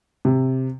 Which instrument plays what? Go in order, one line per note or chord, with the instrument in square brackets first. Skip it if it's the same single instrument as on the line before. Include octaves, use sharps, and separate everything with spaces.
[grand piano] C3